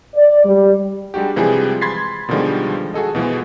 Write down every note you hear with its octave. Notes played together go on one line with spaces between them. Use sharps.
D5
G3
G3 G#3 D4 F#4 G4
C3 E3 F3 G3 G#3 G#4
B5 C6 G#6 A6 B6 C7
B2 D3 D#3 F3 G3 G#3
F#4 G#4 A4 D#5
B2 E3 F3 G#3